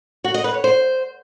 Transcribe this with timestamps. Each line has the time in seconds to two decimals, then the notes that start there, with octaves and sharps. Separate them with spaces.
0.24 F#4
0.34 D#5
0.44 B4
0.54 C#5
0.64 C5